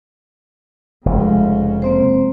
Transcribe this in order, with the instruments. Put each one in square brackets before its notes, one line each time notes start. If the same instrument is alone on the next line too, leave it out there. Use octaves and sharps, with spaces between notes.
[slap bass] F1 [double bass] C#3 G#3
[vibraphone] A#3 C4 C5